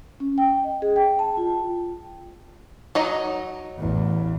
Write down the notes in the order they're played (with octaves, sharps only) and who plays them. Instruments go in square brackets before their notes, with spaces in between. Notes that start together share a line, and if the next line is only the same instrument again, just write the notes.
[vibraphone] C#4
G5
D#5
G#4
G5
A5
F4
[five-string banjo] F#3 D#4 D#5
[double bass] A1 E2